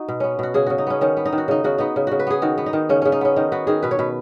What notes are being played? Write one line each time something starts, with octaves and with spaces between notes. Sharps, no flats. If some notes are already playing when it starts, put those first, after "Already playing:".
Already playing: D#4 F#4
B2
B3 C#4
B2 F#4
C#3 G#4
C#3 F#4
D#4
B3 C#4
D#3 C#4
B3
D#4
D#3
F#4
C#3 D#4
C#3 F#4
B3 D#4
C#3
C#3 F#4
B4
B3 G#4
D#3 F#4
B3
D#4
D#3
C#3 C#4
C#3 C#4
D#4
B3 C#4
D#3 D#4
B3 F#4
D#3 G#4
B2 B4
C#5
B2 B4